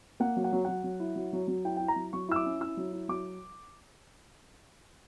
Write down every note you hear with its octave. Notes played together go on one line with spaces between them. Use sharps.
A#3 F#5
F#3
F#5
F#3
F#3 F#5
F#3
E4
F#3
F#3
F#3
E4 G5
E4 G5
A#5
F#3
F#3 C#6
E4 E6
D6
C#4
E4 E6
F#3
E4
F#3 D6